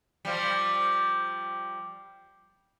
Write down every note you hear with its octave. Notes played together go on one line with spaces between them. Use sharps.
F3 G3